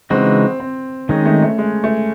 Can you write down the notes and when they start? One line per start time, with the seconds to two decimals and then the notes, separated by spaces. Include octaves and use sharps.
0.10 C#3 E3 G#3 C4 D#4 F#4
0.60 C4
1.09 D#3 G#3 C4 C#4 D#4
1.26 A3
1.42 A3
1.58 G#3
1.84 A3